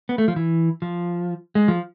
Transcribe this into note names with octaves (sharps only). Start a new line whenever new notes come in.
B3
A3
F3
E3
F3
G#3
F3